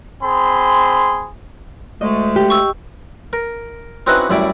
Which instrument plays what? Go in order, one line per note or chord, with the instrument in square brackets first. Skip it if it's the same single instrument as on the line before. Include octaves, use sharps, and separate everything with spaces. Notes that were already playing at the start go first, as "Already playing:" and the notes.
[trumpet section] C4 G#4 B5 C6
[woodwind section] D2 G#3 A3 [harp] D#5
[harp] G4
[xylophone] C#6 E6
[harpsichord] A#4
C4 C#4 D#4 E4 F#4 B4
F#2 A2 G3 E4 D5